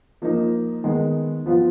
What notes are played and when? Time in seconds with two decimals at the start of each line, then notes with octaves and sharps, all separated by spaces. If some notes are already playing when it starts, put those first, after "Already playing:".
0.22 F3 A#3 D#4
0.84 D#3 G#3 B3
1.46 F3 B3 F4